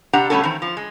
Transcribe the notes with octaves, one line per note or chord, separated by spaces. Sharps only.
C3 D4 G4 F#5 A#5
B2 G3 A3 C#4 F#4 A4
D#3 E3 C4
F3
G#3